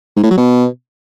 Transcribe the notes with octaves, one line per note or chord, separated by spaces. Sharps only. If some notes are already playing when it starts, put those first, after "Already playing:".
G#2
A2
F#3
B2